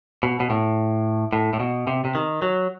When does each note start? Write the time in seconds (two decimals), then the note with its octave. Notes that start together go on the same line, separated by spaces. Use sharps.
0.23 B2
0.40 B2
0.50 A2
1.33 A2
1.53 A2
1.60 B2
1.87 C3
2.05 C3
2.15 D#3
2.42 F#3